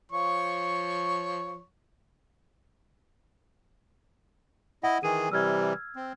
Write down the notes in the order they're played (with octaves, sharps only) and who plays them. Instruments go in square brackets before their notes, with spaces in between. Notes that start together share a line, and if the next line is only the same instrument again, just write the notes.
[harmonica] F3 C#5 C#6
[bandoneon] E4 D#5 [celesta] F#5
[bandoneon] D#3 E3 G#4 [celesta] D#7
[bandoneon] C3 E3 G3 [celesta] E6 F6 G#6
[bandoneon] C4